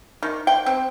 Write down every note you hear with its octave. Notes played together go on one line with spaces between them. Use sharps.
D#3
G5
C4